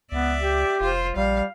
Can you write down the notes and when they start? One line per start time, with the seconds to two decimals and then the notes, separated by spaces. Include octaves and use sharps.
0.12 C#2 B3 D5 E5
0.41 G4
0.81 F1 F4 C5
1.16 A#1 G3 F5